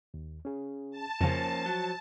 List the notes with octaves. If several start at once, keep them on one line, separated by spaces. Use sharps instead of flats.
D#2
C#4 G#4
A5
F2 C#3 F3 A#3 C#4 C5
F#3